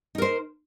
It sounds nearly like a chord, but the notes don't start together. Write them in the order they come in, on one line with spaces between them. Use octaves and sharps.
D#4 A#4 C5